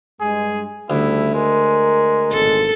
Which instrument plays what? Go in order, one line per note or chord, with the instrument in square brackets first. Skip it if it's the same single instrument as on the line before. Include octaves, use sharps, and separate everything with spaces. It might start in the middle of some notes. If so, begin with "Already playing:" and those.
[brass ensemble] G2 G#3 [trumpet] G#4
[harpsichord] D2 [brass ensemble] C#3 G3 A3 [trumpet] E4
[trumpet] G#3 [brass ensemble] A#4
[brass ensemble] G#1 A2 [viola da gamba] A4